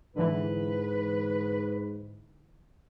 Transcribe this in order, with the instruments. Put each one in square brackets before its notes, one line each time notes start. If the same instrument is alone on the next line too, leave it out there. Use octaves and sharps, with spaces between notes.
[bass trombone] G#2 [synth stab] D3 E3 [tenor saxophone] B4